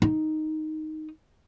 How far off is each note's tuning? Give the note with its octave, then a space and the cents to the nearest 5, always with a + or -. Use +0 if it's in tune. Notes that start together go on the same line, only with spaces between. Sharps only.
D#4 +0